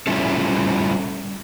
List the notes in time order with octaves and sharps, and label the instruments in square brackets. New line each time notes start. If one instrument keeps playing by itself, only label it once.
[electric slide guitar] G3 A3 C#4 E4 F4 A4